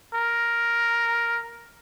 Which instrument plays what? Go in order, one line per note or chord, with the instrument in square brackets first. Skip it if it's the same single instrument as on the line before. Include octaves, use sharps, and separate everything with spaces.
[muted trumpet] A#4